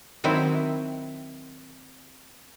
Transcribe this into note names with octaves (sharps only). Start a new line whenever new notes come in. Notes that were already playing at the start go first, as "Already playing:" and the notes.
D#3 F#3 C4 E4